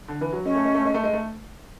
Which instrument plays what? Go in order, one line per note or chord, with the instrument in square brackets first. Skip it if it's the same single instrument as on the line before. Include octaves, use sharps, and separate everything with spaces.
[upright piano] D3
E3
F#3
[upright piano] G#3 [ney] C#4
[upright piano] A3
G#3
A3
G#3
A3
G#3
A3